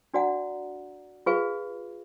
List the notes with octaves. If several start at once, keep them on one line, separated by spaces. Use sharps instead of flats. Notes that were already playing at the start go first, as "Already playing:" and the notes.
D4 F#4 D5 F#5 A#5
F4 G#4 B4 F5